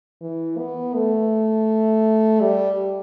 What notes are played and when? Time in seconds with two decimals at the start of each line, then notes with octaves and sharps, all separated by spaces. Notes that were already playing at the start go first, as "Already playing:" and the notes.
0.21 E3
0.58 B3
0.95 A3
2.41 G3